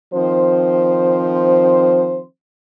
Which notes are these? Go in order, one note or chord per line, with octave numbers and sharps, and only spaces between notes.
D#3 F3 C4 C5